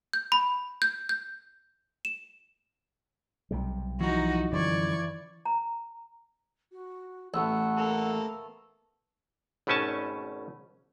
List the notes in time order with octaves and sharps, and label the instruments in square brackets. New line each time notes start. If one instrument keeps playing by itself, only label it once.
[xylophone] G6
B5
G6
G6
E7
[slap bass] B1 C3 G3
[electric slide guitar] E3 F3 A#5 [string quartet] D#4 F#4
[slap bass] F#2 D3 F3 [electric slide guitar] E3 [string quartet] D5 C#6 G#6
[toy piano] A#5
[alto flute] F#4
[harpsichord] A1 [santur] A3 B3 E6 [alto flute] F#5
[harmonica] A#3 A4 A#4
[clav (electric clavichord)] G#1 B2 A3 C#4 G#5 A5